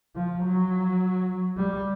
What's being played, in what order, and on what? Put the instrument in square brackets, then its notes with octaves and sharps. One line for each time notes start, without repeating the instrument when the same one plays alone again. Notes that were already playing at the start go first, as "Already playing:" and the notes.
[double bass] F3
F#3
G3